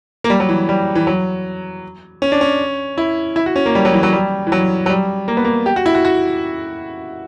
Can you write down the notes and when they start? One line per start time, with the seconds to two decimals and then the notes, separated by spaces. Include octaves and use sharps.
0.24 A#3
0.30 G3
0.40 F#3
0.49 E3
0.69 G3
0.95 E3
1.07 F#3
2.22 C#4
2.32 D4
2.41 C#4
2.98 E4
3.36 E4
3.46 F#4
3.56 C#4
3.66 A#3
3.75 G3
3.85 F#3
3.94 E3
4.03 F#3
4.13 G3
4.47 E3
4.52 F#3
4.86 F#3
4.89 G3
5.28 A#3
5.37 B3
5.45 A#3
5.66 G4
5.76 F#4
5.86 E4
5.95 F#4
6.05 F#4